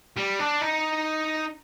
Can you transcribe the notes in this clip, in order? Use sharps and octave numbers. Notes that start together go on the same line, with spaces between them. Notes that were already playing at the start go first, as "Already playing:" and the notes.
G3
D4
D#4